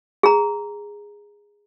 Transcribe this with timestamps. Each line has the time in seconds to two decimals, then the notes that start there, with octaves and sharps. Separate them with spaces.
0.23 G#4 A#5